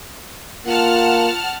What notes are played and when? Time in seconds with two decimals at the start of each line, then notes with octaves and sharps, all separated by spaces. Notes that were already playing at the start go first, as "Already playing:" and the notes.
0.66 A#3 F4 F#5 A5 F6